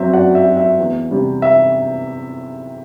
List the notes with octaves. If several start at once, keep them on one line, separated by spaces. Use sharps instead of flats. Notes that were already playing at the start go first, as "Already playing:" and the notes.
Already playing: F#2 F#3 C4 E5
F#2 D5 F#5
E5
F#3 C4
E5
E2
C3 G3
E5